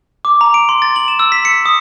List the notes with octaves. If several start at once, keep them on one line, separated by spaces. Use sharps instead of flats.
D6
A#5
D7
C6
A6
F#7
E7
E6
B6
C#7
D#6